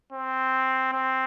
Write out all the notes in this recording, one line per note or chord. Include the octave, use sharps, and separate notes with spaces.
C4
C4